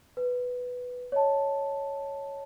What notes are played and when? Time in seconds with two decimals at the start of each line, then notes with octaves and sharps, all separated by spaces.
0.17 B4
1.12 C#5 D#5 A5